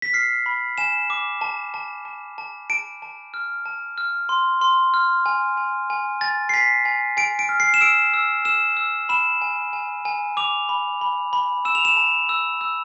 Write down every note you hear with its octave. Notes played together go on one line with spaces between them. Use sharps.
B6
F6 C7
B5
G#5 E7
D6
A5
A5
A5
A5
A5 D7
A5
F6
A5
F6
C6
C6
F6
G#5
G#5
G#5
G#5 A6
C7
G#5 B6
G#5
G#5 D7
D7
F6
C7
E7
E6 D7
E6
E6 E7
E6
B5 E7
G#5
G#5
G#5
D6 F7
B5
B5
B5
E6 E7
F7
E7
A5
E6
E6